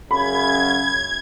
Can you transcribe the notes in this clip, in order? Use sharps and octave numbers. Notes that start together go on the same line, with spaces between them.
F#2 C#3 B5 G#6